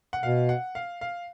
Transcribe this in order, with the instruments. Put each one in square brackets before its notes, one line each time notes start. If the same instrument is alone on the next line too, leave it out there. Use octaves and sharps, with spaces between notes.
[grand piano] F#5
[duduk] B2 [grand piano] F5
[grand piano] F#5
F5
F5